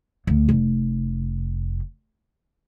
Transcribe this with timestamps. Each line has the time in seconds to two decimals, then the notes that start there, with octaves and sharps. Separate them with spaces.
0.27 D2
0.49 F1